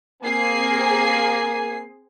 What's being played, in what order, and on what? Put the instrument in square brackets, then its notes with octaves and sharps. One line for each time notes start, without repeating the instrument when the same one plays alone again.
[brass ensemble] A#3 G#5 [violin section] C4 G#4 C7